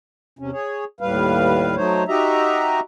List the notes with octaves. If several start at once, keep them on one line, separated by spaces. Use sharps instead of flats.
E2 C3 C#4
G#4 C#5
D#2 A2 G3 B4 F5
F#3 A3 D#4 C5 C#5
D#4 F#4 G4 D#5 E5 A#5